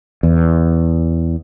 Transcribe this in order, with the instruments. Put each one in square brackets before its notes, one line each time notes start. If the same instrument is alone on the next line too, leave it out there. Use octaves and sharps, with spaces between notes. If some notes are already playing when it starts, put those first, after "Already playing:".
[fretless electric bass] E2